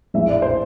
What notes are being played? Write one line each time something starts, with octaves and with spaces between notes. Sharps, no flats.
A#1 A2 E3 E5
D5
C5